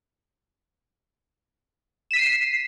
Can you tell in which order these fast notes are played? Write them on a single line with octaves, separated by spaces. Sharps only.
E7 B6 D#7 C7